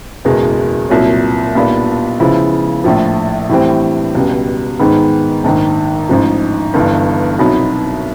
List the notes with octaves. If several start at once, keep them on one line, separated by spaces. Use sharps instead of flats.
F#1 E2 B2 G#3
C2 A#2 F#3
B1 A#2 G3 B3 D4
C#3 F3 G#3 B3 E4
A#1 A2 F3
A2 E3 G3 C4
C#2 B2 G3
G#2 D#3 G#3 B3
A#1 G#2 D#3
A1 G#2 F3
G1 G2 E3
C2 B2 F#3 B3 D#4